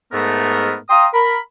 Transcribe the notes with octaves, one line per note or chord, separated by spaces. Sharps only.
G#2 A3 B3 A#4
F5 G5 A#5 C6 D#6
A#4 B5